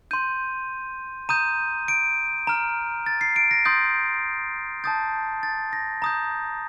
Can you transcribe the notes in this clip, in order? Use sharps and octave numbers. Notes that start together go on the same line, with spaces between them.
C6 G6 D#7
A#5 D#6 G6 D#7
D7
A#5 F6
A6
C7
D7
A#6
C6 D#6 G6 A6
A5 D#6 G6 A6
A6
A#6
A#5 D#6 G6